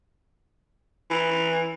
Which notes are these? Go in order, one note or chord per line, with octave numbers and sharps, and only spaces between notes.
E3